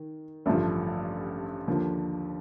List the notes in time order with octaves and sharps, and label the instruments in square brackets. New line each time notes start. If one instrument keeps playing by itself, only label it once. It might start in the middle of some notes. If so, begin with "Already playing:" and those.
Already playing: [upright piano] D#3
A1 G2 D3 F3 A3
D#2 D3 F3